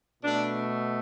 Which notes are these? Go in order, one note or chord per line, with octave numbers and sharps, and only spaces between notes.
B2 A3 D4